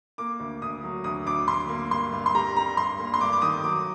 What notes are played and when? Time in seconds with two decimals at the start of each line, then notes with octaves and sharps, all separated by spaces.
0.18 A#3 D6
0.40 D2
0.62 D2 D#6
0.84 F#3
1.04 D2 D#6
1.26 D2 D6
1.48 D2 C6
1.69 A#3
1.91 G2 C6
2.12 G2
2.26 C6
2.35 G3 A#5
2.56 G3 A#5
2.77 G2 C6
2.99 A#3
3.14 C6
3.21 G2 D6
3.33 D6
3.42 D#3 D#6
3.64 F#3 D6